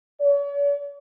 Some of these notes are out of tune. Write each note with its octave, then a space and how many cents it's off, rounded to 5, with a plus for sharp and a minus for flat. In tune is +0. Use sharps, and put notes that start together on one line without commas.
C#5 +45